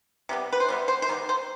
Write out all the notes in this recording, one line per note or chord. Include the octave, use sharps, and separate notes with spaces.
C3 G3 B3
B4
C5
C3 G3 B3
C5
C5
D#3 G3 B3
C5